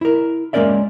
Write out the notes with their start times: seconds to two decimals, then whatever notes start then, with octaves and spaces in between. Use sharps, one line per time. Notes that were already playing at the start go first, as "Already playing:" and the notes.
0.01 E4 A#4
0.53 G#3 A#3 C#4 A#4 D5 E5